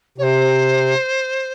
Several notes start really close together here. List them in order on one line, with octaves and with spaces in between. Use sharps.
C3 C#5 C5